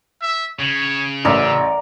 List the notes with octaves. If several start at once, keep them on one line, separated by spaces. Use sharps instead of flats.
E5
C#3 C#5
A1 A#4 D5 E5 F#5